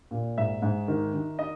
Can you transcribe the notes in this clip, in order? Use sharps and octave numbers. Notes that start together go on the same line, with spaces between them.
A#2
G#2 E5
G#2
D#3
D#3
D#5